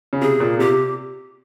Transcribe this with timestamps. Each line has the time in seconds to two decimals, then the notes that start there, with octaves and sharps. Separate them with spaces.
0.13 C#3
0.22 C3 G#4
0.40 A#2
0.59 C3 G4